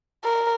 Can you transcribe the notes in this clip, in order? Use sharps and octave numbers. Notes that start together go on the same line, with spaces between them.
A#4